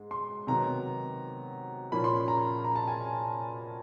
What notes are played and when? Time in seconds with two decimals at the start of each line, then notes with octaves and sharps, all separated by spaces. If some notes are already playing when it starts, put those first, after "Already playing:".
Already playing: G#2 G#3
0.11 C6
0.47 C3 D#3 F#3 B3 A#5
1.92 A#2 F3 A#3 C#4 B5
2.04 C6
2.28 A#5
2.64 A#5
2.76 A5
2.88 G#5